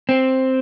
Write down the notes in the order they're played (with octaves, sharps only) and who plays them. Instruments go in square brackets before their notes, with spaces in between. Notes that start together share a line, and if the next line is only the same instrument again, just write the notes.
[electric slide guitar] C4